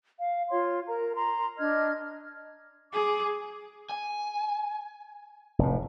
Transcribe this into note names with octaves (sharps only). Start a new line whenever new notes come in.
F5
F4 C#5 C6
A#4 A#5
A#5 C6
D4 D#5 F6 G#6
G#4 D6
G#5
F1 A2